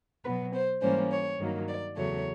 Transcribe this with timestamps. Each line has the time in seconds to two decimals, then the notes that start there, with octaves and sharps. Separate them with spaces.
0.24 B2 F#3 B3 B4
0.54 C5
0.81 G#2 E3 G3 A#3 C#4 C5
1.10 C#5
1.39 G2 D#3 F#3 A#3
1.68 D5
1.96 E2 C#3 F#3 A3 C#5